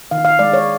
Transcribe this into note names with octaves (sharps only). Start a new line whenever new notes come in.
D#3 F5
F5
G#3 D5
C#5